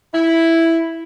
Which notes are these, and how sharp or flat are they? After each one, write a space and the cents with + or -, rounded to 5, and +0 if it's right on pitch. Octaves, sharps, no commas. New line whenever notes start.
E4 +0